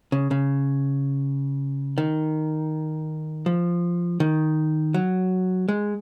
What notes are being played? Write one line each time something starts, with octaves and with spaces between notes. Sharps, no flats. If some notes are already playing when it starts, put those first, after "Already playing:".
C#3
C#3
D#3
F3
D#3
F#3
G#3